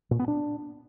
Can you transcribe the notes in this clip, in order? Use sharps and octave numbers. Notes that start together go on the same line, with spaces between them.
A#2
B3
D4